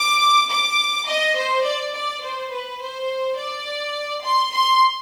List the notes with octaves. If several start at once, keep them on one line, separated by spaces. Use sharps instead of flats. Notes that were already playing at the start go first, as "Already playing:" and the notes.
Already playing: D6
D6
D#5
C5
D5
D5
C5
B4
C5
D5
C6
C6